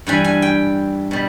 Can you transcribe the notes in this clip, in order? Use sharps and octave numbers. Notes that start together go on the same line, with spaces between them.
G2 E3 G3 G#5
G#5
G5
B2 G3